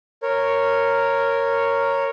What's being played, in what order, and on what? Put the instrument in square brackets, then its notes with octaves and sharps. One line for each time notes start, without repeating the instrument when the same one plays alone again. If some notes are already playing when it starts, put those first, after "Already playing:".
[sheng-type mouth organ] A#4 C#5